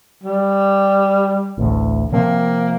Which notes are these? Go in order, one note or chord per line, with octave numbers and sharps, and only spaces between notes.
G3
A1 D2 A2
C3 F3 A#3 C4